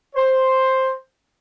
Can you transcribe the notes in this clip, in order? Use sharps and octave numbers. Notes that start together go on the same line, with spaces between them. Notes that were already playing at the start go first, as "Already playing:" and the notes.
C5